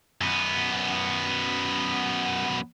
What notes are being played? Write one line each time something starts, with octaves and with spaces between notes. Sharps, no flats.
F#2 B3